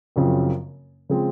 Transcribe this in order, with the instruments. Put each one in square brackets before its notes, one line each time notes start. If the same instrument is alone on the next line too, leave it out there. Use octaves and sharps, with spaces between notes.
[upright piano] F#1 F#2 C#3 F3 C4
C#3 F3 G#3 C4